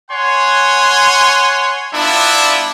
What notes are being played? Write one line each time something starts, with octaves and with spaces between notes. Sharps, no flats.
C#5 F#5 G#5 C6
G3 B3 D4 E4 F4 E5